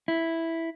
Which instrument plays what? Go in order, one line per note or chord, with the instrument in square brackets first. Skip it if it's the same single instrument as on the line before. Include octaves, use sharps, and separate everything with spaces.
[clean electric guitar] E4